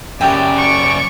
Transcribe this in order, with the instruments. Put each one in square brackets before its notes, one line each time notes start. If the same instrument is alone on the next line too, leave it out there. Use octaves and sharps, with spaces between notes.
[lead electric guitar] F#2 C#3 [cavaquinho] G4 E5 G5 [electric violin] D5
[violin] C#6 D7